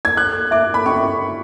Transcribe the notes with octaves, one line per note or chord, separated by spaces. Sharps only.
G#6
A4 F#6
E5 D6
B5
C#4 C#6